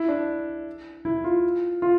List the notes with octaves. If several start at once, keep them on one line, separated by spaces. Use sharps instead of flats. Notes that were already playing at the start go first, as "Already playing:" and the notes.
Already playing: E4
D4
E4
F4
F4